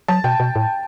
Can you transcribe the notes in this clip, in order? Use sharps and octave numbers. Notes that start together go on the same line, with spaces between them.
F#3 A5
B2 G5
B2
A2